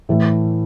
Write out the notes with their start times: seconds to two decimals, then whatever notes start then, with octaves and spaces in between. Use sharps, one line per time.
0.09 A2 E3 A3